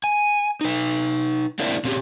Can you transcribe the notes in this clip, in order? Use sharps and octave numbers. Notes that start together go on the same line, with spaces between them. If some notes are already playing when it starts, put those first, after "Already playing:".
G#5
D#4 B4
G#3 A#3 C4 D4 E4
A#2 C4 C#4 E4 G4 G#4